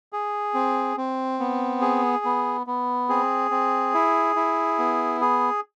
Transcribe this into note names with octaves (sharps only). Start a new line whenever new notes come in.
G#4
C4
C4
B3
G#4
B3
B3
C4 G#4
C4
E4
E4
B3
G#4